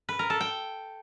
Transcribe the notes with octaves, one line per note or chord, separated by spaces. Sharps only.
B4
A#4
A4
G5